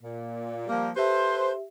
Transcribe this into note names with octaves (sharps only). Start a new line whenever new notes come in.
A#2
F3 G3 A#3
G4 A4 B4 C5 E5